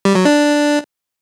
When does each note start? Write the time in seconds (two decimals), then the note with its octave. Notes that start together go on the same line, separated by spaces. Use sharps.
0.05 G3
0.15 F#3
0.25 D4